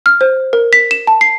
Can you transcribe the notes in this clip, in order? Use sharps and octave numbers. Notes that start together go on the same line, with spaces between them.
F6
C5
A#4
B6
E7
A5
C7